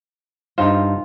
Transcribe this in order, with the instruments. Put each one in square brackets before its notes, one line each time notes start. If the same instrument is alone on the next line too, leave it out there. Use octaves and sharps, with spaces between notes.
[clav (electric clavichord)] G2 D#4 C5 [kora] F4